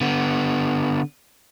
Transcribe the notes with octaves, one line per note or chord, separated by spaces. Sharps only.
D3 B3